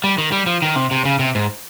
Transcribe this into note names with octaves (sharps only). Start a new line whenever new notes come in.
G3
D#3
G3
F3
D#3
C3
C3
C#3
C3
G#2